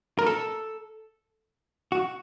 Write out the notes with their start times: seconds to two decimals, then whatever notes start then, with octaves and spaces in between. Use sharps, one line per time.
0.19 A#4
0.26 A4
1.92 F#4